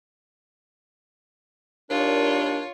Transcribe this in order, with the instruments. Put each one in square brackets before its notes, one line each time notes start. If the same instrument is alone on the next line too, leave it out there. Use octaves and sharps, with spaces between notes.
[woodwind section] D#2 A#2 D4 [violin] F4 C#5